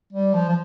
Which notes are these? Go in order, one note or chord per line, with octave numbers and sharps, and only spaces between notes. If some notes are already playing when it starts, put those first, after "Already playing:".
G3
F3
F3